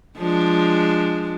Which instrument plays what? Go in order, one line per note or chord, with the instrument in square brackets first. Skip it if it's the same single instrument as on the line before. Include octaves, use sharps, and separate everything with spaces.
[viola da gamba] F3 G#3 D4